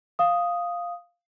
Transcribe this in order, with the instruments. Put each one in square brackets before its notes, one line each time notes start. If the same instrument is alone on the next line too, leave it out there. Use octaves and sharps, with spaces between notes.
[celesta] F5 D#6